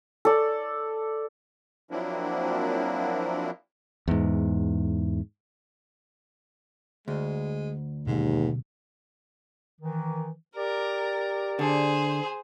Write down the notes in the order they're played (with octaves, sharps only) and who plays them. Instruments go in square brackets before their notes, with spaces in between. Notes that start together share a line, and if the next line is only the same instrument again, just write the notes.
[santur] A4 D5
[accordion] F3 F#3 A#3 C4 D4 E4
[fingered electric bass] E2 G#2
[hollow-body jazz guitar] D2 [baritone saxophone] G#3
[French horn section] D#2 [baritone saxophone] G#2 [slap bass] B2 D3 F#3
[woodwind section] D#3 E3
[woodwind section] G4 D5 [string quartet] A#4
[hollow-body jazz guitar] D3 D4 [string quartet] G#4 C5